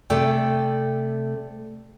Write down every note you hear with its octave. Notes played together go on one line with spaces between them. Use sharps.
C3 A3 A4 D5 G5